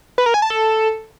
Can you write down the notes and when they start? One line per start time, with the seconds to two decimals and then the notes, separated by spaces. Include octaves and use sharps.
0.18 B4
0.26 A#4
0.34 G#5
0.42 A5
0.50 A4